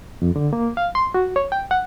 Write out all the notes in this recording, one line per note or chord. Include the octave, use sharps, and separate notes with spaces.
F2
D3
A#3
F5
C6
F#4
C#5
G5
F#5